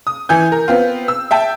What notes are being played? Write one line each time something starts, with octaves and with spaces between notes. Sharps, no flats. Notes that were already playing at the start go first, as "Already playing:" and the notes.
D#6
E3 G#5 G6
A#4
B3 C4 F4
E6
E5 G5 A5